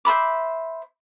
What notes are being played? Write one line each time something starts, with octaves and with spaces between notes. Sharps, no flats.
C5 E5 B5 D6